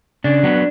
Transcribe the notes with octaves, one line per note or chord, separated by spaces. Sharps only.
C#3 D4
F#3 B3